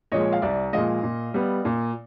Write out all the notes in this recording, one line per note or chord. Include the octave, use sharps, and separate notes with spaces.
A#2 F3 G#3 C#5 D#5
F5
C2 D5 E5
A#2 F3 G#3 D#5 F5
A#2
G3 B3
A#2